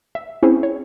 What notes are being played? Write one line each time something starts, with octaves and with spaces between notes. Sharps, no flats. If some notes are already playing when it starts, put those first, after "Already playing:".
E5
C4 C#4 E4 G#4 C5
C#5